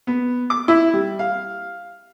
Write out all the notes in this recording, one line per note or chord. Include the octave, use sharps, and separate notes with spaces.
B3
D6
E4
G3
F5